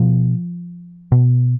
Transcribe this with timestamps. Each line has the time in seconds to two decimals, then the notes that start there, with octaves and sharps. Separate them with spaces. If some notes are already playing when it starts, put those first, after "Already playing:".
Already playing: B2 F3
1.12 B2